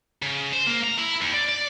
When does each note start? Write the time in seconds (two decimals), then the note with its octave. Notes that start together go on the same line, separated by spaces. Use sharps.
0.22 C#3
0.53 C5
0.66 A#3
0.84 A#5
0.98 E4
1.21 D#2
1.34 D5
1.49 D5